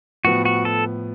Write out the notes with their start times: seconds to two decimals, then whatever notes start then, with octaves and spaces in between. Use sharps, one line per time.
0.25 A2 F3 B3 F#4
0.45 F#4
0.65 A4